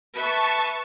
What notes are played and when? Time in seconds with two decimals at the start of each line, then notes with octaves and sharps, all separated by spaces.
0.14 B4 E5 A5 C#6